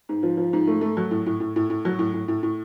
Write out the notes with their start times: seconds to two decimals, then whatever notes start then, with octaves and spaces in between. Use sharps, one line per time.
0.09 G#2
0.23 F3
0.37 F3
0.53 G#2
0.67 A3
0.81 A3
0.97 F#3
1.11 A2
1.26 A2
1.40 A2
1.56 A2
1.70 A2
1.85 F#3
1.99 A2
2.14 A2
2.28 A2
2.43 A2